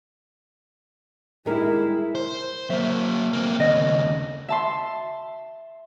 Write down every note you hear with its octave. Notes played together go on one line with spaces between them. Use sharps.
G3 G#3 E4 A#4
C5
F#3 A#3 E5
A#3 C4
D#2 C#3 D#5
E5 A5 C6